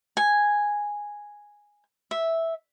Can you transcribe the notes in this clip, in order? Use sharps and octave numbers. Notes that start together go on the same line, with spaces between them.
G#5
E5